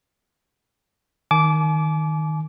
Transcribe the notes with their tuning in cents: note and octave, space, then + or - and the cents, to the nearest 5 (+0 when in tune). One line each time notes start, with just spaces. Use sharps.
D#3 +0 G#5 +45 D6 -15